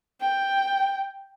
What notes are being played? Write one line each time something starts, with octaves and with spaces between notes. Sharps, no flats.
G5